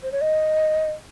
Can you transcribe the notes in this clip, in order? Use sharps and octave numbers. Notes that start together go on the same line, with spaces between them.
C5
C#5
D#5